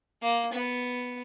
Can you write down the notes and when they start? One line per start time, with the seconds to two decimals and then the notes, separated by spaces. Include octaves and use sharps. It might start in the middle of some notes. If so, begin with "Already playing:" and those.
0.22 A#3
0.52 B3